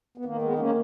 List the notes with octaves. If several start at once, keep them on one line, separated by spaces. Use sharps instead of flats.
B3
D#3 A#3
G#3 B3
A#3 C#4